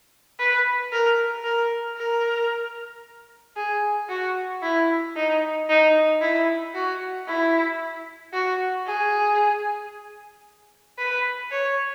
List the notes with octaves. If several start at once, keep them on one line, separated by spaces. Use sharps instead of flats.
B4
A#4
A#4
A#4
G#4
F#4
E4
D#4
D#4
E4
F#4
E4
F#4
G#4
B4
C#5